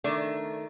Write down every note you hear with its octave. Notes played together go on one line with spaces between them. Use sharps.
D#3 A3 D4